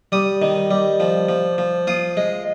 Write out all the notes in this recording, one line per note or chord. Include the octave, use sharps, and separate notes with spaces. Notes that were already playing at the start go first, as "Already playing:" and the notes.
G3 D#6
D#3
G3
F3
F3
F3
F4 D#6
G#3